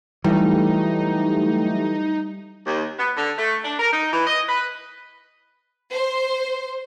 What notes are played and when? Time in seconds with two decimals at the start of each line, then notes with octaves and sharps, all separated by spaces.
0.24 E3 F#3 G3 A3 D#4 G4
2.66 D#2
2.99 B3
3.16 D3
3.38 A3
3.63 D4
3.79 A#4
3.93 D#4
4.12 E3
4.27 D#5
4.48 B4
5.93 C5